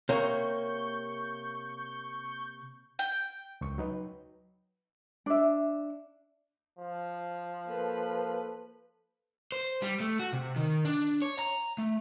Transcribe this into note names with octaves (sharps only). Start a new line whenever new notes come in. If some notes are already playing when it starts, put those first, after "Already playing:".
C3 A#3 C#5 C#6 G6
G5
C#2 C#6
F#3 D#4 B4
D4 E5
F3
A#3 A4 B4
C5
G3
A3
F#4
C3
D#3
D4
C#5
A#5
A3